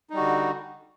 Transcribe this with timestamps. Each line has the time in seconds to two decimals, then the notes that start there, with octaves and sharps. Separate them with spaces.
0.10 D#4
0.13 G3
0.16 F#4
0.20 D3